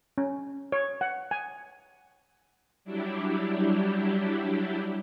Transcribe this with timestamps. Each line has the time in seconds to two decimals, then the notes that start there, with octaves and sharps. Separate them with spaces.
0.18 C#4
0.72 C#5
1.01 F#5
1.31 G#5
2.84 F#3 G3 D4 E4 G4